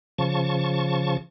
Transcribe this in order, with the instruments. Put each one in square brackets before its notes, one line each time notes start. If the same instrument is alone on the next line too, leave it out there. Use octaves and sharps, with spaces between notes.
[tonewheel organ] C#3 F3 A5 C#6